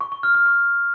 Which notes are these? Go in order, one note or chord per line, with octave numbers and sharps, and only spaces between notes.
C#6
C#6
F6
F6
C#6